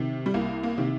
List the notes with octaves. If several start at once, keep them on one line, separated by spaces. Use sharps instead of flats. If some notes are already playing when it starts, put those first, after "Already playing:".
Already playing: C3 D#3
G3
C2 A#3
A#3
C3 D#3